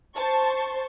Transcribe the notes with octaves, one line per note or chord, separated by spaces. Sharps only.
C5 A5 C#6